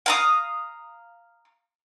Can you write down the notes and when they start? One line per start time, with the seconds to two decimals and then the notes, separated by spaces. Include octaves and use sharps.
0.06 F5 A#5 D#6